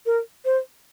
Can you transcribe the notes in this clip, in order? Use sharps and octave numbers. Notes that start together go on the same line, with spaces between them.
A#4
C5